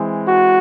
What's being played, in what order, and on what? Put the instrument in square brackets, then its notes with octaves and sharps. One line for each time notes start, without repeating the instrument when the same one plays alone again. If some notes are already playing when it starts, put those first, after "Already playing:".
Already playing: [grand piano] E3 G#3 C4
[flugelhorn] F#4